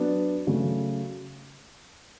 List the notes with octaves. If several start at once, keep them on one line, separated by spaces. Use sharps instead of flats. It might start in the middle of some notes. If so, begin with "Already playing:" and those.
Already playing: F#3 B3 D4
C#3 F#3 A3